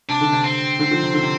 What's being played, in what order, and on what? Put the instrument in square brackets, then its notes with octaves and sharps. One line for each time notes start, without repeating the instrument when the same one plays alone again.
[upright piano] C3 [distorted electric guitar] D4
[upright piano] D3
C3
[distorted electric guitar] C4
[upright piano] D3
D3 F3
C3
D3
C3